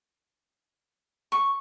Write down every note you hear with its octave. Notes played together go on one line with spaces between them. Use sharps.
C#6